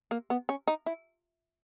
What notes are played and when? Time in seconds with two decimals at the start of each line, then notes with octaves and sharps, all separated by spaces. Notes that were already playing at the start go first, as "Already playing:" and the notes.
0.11 A#3
0.30 B3
0.49 C#4
0.67 D#4
0.86 E4